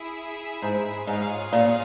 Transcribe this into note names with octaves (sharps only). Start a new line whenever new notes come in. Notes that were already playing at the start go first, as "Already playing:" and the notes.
Already playing: E4 G#4 E5
G#2
G#2 F4 G#4 C#5 F5
A#2